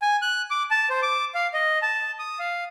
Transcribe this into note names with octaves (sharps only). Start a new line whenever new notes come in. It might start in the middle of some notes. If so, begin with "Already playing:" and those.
G#5
F#6
D6
A5
C5
D6
F5
D#5
A5
D#6
F5